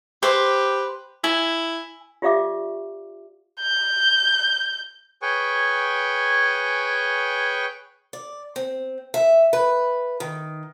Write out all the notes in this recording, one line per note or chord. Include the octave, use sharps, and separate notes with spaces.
G4 B4 C5
E4 G#5
F4 G4 D5 E5 F5 D6
G6
G#4 B4 C#5 G5 G#5 C#6
D5
C4
E5
B4
D#3